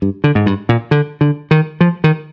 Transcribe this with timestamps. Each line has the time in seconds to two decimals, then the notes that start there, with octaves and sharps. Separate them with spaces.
0.02 G2
0.24 D3
0.35 G#2
0.46 G2
0.69 A#2
0.91 D3
1.21 D3
1.51 D#3
1.81 F3
2.04 D#3